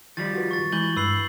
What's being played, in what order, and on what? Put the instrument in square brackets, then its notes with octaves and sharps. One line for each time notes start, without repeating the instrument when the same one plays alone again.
[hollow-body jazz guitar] D#3 F3 G3 [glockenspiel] A6
[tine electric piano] F4 F#4 B4
[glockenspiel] C#6 A6
[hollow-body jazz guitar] E3 [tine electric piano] G#3 [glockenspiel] G6 F#7 G7
[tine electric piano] G2 [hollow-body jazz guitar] B4 [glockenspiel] E6 C7 F#7